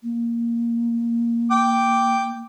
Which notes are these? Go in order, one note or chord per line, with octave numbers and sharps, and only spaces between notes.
A#3
G5 D6